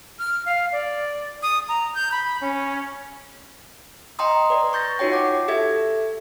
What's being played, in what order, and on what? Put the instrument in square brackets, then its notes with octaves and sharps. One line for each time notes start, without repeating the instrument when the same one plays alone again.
[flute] F6
F5
D5
D#6
A#5
G6
B5
C#4
[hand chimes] D#5 G5 A#5 C6 D#6
B4 D5
C#6 G6 A6 A#6
D#4 F4 F#4 C#5 G5
F#5 D6
G4 A4 E5 G#6